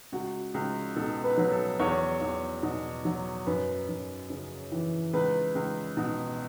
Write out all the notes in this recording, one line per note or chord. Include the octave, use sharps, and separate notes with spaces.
C#2 F#4
C#2
B2 A4
B4
F#3
A4
E2 C#5
E2
B2
F#3
F#2 B4
F#2
C#3
E3
C#2 B4
C#2
B2